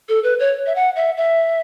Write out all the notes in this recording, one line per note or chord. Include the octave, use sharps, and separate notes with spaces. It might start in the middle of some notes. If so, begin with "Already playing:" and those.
A4
B4
C#5
E5
F#5
E5
E5